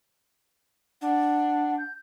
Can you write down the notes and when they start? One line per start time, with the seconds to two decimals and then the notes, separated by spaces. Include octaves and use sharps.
1.02 D4 F#5
1.78 G6